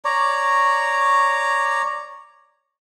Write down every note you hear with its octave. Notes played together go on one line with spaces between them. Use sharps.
C#5 D5 A#5